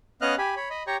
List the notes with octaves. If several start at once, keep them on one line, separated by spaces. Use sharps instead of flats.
B3 C#4 D#5 F5 F6 F#6
G4 G#5 B5
C#5 B5
D#5 B5
G4 C#5 G5 A#5 C#6